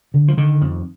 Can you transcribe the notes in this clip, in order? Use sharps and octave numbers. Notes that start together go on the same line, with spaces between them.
D3
F3
D3 D#3
F2